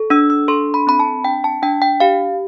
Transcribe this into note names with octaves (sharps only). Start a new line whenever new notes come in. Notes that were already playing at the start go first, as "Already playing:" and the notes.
Already playing: A4
D4 E6
E6
A4 C6
B5
C4 B5
A5
D4 G5
A5
D4 G5
G5
G4 F5